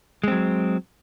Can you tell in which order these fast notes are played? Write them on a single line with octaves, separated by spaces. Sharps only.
G#3 C4 F#3